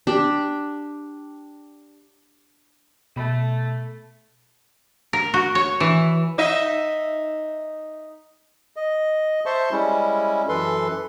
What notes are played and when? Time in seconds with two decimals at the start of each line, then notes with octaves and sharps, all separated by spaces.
0.07 D4 G4
3.16 B2 A3 B5
5.13 A#4
5.34 F#4
5.55 C#5
5.80 E3
6.38 D#4 D#5 E5
8.76 D#5
9.46 C5 E5 A5 C6 C#6
9.72 G3 G#3 C#4 E4
10.49 F#2 E3 A4 B4 C6